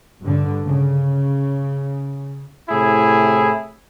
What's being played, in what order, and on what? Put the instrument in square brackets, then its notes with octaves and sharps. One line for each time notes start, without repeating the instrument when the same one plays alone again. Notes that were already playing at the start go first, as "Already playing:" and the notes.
[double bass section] G2 D3
C#3
[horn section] A2 C3 E4 G#4